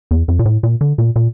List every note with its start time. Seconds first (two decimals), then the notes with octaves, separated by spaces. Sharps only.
0.11 E2
0.28 F2
0.39 A#2
0.45 A2
0.63 A#2
0.81 D3
0.98 A#2
1.16 A#2